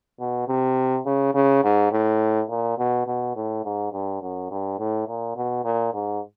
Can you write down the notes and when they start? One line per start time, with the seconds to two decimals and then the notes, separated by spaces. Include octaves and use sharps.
0.20 B2
0.48 C3
1.05 C#3
1.34 C#3
1.63 G#2
1.91 A2
2.49 A#2
2.78 B2
3.07 B2
3.36 A2
3.65 G#2
3.92 G2
4.21 F#2
4.50 G2
4.79 A2
5.08 A#2
5.36 B2
5.64 A#2
5.93 G#2